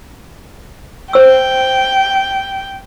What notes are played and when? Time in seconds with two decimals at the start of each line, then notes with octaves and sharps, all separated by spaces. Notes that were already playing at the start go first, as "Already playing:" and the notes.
1.13 C5 G5 E6